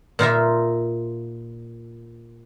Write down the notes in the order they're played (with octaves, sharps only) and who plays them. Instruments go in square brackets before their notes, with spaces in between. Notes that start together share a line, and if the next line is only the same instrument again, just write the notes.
[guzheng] A#2 D#4 F4 E5